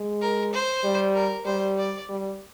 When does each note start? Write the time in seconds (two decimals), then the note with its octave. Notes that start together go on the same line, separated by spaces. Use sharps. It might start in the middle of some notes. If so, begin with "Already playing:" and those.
Already playing: G#3
0.21 A#4
0.53 C5
0.84 G3
1.14 A#4
1.46 G3 C5
1.78 D5
2.09 G3